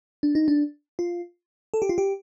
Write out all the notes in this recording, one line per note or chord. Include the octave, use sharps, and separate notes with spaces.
D4
D#4
D4
F4
A4
G4
F4
G4